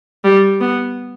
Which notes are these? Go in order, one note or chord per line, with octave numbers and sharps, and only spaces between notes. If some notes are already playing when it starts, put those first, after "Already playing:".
G3
B3